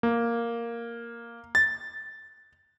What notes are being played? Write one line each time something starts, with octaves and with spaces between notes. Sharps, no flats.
A#3
A6